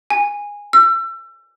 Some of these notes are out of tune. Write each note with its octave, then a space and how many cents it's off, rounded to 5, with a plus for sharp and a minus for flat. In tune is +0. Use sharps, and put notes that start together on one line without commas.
G#5 -15
E6 +35